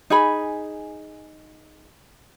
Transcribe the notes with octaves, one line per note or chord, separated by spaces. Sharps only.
D#4 G#4 G#5 B5